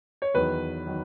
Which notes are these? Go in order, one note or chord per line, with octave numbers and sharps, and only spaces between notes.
C#5
E2 D#3 F#3 B4
D#3 F#3